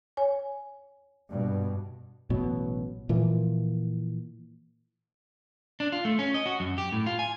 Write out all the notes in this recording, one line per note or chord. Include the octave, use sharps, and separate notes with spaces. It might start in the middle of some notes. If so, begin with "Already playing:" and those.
C#5 G#5
G2 B2
A1 B2 F#3
A#2 E3 F3 A#3
D4
F4
A3
C#4
D#5
F#4
F#2
G4
A2
F4
G#5